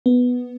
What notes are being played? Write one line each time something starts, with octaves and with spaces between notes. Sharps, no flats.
B3